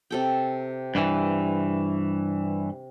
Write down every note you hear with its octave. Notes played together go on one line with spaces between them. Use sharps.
C3 A4 G5
G2 E3